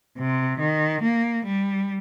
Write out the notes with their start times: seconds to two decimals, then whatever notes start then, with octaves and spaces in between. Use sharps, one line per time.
0.18 C3
0.59 D#3
1.02 A#3
1.45 G3